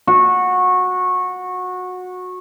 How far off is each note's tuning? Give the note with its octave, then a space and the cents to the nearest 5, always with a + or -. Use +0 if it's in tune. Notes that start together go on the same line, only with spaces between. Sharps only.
F#4 -20